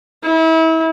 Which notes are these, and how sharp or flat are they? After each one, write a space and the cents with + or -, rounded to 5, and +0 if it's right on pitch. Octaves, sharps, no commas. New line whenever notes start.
E4 -35